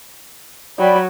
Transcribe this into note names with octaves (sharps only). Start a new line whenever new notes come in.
F#3 D5 G5 B5